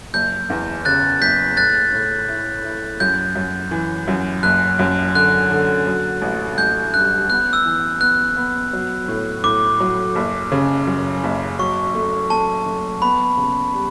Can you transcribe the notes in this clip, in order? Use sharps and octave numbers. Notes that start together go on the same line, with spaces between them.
F#1 G6
E2
C#3 F#6 A6
F#1 G6 B6
A2 F#6 A6
A2
E4
E4
F#2 G6
F#2
E3
F#2
F#1 F#6
F#2
D3 F#6
D3
F#3
A1
A1 G6
G2 F#6
B3 F#6
E6
E3
B3 F#6
B3
F#3
A2
A2 D6
F#3
F#1
C#3
F#2
F#1
F#3 C#6
A3
A3 A5
A3
B3 B5
C#3
G3